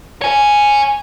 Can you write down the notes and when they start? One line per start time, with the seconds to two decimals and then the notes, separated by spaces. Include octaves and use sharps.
0.22 C#5 G#5